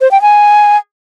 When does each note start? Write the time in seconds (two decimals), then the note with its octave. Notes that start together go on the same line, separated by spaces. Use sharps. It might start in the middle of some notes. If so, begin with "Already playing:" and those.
0.01 C5
0.11 G5
0.22 G#5